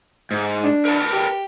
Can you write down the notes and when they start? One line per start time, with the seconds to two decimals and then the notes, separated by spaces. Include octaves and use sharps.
0.31 G#2
0.64 D4
0.85 A#4 B4 A5
1.13 G4